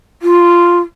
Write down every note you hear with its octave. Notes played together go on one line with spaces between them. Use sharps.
F4